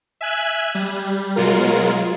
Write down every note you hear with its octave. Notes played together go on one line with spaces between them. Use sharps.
E5 G#5 F#6
G3
B2 F#3 G#3 F4 A#4